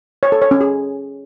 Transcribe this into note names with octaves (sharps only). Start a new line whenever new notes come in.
C#5
A4
C#5
C#4
G#4